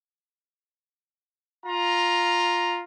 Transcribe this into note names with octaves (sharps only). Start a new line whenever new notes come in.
F4 A#5